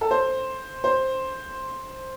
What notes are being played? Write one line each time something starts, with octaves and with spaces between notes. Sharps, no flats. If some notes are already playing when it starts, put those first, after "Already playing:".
A4
C5
C5